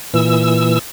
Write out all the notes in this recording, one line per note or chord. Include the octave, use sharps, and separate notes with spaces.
A#2 E3 E6